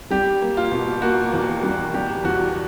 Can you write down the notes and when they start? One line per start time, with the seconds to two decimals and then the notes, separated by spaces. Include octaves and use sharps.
0.11 G3 G4
0.41 A#3
0.57 F4
0.72 B2
1.02 A#3 F#4
1.33 E2
1.63 G3
1.94 G3 G4
2.24 E2 F#4